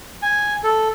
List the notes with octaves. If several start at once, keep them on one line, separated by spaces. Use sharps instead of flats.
G#5
A4